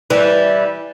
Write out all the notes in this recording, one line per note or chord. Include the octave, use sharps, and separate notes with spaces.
E3 G3